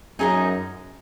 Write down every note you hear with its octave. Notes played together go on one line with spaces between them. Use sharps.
F#2 D#4 G#4 D#5 A#5